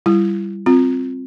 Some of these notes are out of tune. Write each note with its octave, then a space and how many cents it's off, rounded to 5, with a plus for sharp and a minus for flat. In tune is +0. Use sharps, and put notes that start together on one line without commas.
G3 +0 E4 +35
C4 +0 F4 +15